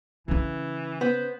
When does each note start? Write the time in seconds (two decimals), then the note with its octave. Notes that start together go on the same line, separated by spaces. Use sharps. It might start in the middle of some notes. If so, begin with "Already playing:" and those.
0.28 C#3 E3 C#4
1.01 B3 C5